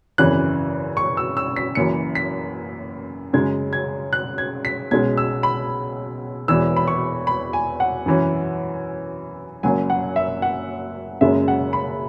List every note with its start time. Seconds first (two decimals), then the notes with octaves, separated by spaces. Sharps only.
0.18 G#1 F#2 C#3 E3 C#4 F#6
0.97 C#6
1.17 E6
1.37 E6
1.56 B6
1.75 F#1 F#2 E3 C#7
2.15 B6
3.33 F#2 C#3 G#3 C#4 G#6
3.73 G#6
4.13 F#6
4.38 G#6
4.65 B6
4.91 B1 B2 G#3 C#4 G#6
5.18 E6
5.43 B5
6.48 E1 E2 E3 E6
6.76 B5
6.88 C#6
7.27 B5
7.53 G#5
7.80 F#5
8.06 F#2 E3 C#4
9.63 F#1 F#2 F#3 G#5
9.90 F#5
10.16 E5
10.42 F#5
11.21 F#1 F#2 C#3 G#3 C#4 E5
11.48 F#5
11.73 B5